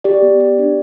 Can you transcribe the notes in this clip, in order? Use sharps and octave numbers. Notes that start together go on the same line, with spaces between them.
G4 D5
B3
G4
D4